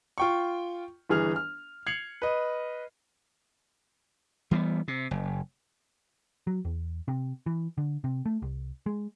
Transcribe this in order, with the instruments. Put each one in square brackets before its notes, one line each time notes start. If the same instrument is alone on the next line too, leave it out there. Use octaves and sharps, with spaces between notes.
[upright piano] F4 G5 C#6
G1 E3 G#4 F6 F7
F6
G#6 C7 C#7 F7 F#7
B4 D#5
[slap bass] E3 G3 A3 B3
C3
F#1
[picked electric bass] F#3
E2
C3
E3
D3
C3
A3
C2
G#3